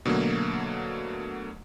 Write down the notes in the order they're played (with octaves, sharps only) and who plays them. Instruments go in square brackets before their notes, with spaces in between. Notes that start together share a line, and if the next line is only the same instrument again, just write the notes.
[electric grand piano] B2 D3 F#3 A3 A#3